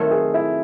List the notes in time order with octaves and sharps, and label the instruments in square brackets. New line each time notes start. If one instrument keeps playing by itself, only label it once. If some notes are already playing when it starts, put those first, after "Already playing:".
Already playing: [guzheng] D#3 F#3 A3 C4 [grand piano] A4
[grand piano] G#4
E4